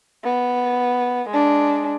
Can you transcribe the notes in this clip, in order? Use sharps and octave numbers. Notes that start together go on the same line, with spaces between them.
B3
G#3 D4